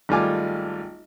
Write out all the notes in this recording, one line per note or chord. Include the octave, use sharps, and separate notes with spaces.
G#1 G3 A3 F4 G#5 D6